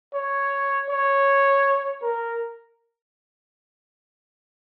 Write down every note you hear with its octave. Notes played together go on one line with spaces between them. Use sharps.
C#5
C#5
A#4